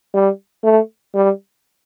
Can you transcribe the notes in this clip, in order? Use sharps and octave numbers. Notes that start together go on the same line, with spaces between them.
G3
A3
G3